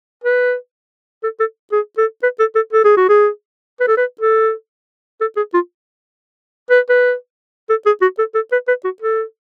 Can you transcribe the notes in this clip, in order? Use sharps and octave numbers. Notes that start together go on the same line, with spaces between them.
B4
A4
A4
G#4
A4
B4
A4
A4
A4
G#4
F#4
G#4
B4
A4
B4
A4
A4
G#4
F4
B4
B4
A4
G#4
F#4
A4
A4
B4
B4
F#4
A4